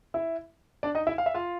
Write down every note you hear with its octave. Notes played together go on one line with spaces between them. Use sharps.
E4 E5
D4 D5
D#4 D#5
E4 E5
F5
E5
F4 F5